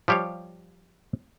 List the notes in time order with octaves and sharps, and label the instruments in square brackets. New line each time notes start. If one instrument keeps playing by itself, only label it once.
[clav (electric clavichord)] F3 G3 G4 C#5 F5